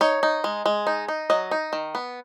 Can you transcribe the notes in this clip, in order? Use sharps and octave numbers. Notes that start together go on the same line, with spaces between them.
D#4 C#5
D#4
G#3
G#3
D#4
D#4
F#3 D#5
D#4
D#3
B3